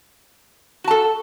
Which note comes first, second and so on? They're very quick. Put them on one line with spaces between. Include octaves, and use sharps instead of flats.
F#4 A5 A4